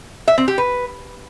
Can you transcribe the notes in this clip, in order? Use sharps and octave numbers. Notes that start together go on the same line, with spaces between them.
E5
C4
G4
B4